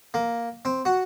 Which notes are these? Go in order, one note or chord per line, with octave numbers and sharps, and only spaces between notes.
A#3
C4
F#4